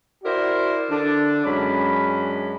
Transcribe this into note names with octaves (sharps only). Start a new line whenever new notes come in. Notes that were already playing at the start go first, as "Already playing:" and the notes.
E4 F#4 A#4 C5 D5
D3 D4
F#2 G#3 C#4 D4 B5